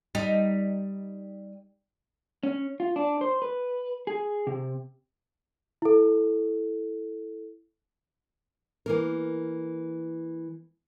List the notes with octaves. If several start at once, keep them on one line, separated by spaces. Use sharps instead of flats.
G3 D#4
C#4
F4
D4
C5
B4
G#4
C3
E4 A4
E3 A#3 A#4